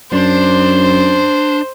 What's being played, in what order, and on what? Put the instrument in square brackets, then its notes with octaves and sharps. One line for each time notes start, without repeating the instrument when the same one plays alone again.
[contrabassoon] F#2 [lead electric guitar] D4 [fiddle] C5